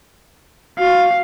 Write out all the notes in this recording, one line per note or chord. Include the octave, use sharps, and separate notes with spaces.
F#4 F5